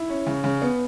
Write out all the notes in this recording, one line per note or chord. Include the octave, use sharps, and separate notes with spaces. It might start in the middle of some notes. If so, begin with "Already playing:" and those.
Already playing: E4
C#4
C#3
C#3
B3